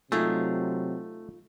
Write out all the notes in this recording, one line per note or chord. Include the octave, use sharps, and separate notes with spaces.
C3 F#3 A3 D#4 F4 G#4